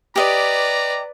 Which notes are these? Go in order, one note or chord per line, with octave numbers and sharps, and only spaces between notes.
G4 B4 D5 D#5 A#5